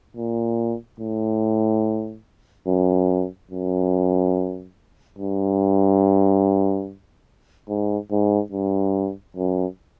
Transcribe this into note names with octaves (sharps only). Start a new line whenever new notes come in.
A#2
A2
F#2
F#2
G2
G#2
G#2
G2
F#2